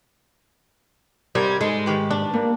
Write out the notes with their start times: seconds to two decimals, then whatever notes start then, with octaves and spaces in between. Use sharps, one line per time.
1.35 G#2 C3 G3 A#4 G#6
1.61 G#2 G#3 A4
1.86 D#3 G4 B4
2.11 D4
2.34 G3 A#3